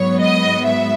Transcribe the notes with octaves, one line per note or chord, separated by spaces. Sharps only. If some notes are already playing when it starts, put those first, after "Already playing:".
Already playing: G#2 F#3 B3 C#5
D#5
E5